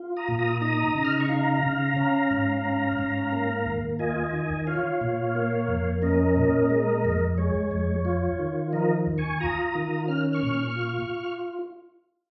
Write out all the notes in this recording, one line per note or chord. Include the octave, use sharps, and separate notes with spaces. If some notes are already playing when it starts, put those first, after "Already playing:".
Already playing: F4
A#5 D#6
A#2
A#5 D#6
D#4 A#5 D#6
C#3
F6
D#6
C#6
D#4 F5 A#5
C#3
C#4
G#2
C#4
G#2
A#3
D#2
F4 D#5 G#5
D#3
F4 C#5 F5
A#2
A#3
F2
C#4 A#4 D#5
A#2
G#3
F2
G#3 C#5
F2
F4
D#3
F3 A#4 D#5
D#2
G#5 C#6
F4 A#5 D#6
D#3
C#4 F6
C#6 F6
A#2
F4